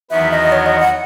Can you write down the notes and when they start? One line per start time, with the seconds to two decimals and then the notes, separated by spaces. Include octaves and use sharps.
0.10 E2 D#3 F#3 B3 F#4 E5
0.31 D#5
0.52 C#5
0.66 D#5
0.79 F#5